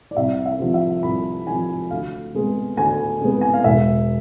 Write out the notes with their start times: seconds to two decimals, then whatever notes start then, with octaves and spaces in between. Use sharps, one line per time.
0.11 D5
0.17 C2 E5
0.46 E5
0.59 C3 F3
0.74 E5
1.03 C2 B5
1.47 C3 F3 G#5
1.91 D2 F5
2.34 C3 G#3 B3
2.77 D2 G#5
3.21 C3 G#3 B3
3.41 G#5
3.54 F5
3.64 E1 E5